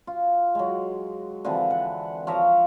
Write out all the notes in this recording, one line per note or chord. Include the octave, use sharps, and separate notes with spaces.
F4
F#3 G#3
D3 E3 F3 C4
F#5
F3 C#5 E5 A#5